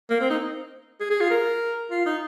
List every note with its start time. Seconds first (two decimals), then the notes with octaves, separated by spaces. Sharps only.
0.10 A#3
0.20 C4
0.30 D#4
1.00 G#4
1.10 G#4
1.21 F4
1.30 A#4
1.90 F4
2.06 D#4